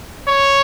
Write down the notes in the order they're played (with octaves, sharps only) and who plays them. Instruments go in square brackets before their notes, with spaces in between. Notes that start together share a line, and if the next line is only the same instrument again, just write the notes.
[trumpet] C#5